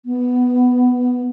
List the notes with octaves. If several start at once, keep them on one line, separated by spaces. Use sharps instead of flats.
B3